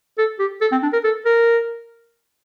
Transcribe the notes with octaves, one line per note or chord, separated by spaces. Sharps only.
A4
G4
A4
C4
D4
A#4
A4
A#4